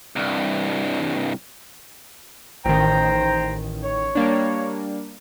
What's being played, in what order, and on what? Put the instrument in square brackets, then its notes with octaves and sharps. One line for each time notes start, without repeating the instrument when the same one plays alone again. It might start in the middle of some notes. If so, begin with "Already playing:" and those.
[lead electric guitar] C2 G2
[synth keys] A1 D#3 [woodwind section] C5 G5 A#5
[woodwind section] C#5
[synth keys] G3 A#3 D4